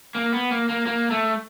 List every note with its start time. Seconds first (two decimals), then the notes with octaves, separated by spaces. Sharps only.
0.15 A#3
0.32 B3
0.51 A#3
0.69 A#3
0.86 A#3
1.11 A3